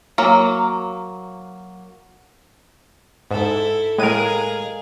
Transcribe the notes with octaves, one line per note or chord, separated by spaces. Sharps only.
F#3 A#3
G#2 E4 A4
A2 G#3 G#4 A#4 F5 D#7